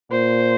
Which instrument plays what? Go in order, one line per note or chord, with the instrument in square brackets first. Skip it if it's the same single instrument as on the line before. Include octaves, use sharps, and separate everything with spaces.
[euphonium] A#2 [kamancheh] C5